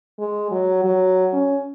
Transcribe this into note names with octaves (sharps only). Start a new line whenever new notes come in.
G#3
F#3
F#3
C#4